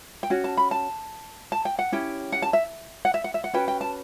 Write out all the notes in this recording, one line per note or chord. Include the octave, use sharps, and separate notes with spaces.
G5
C#4 F#4
A5
B5
A5
A5
G5
F#5
C#4 E4 G4 G5
F#5
A5
E5
F#5
E5
F#5
E5
F#5
C#4 F#4 B4 G5
G5
A5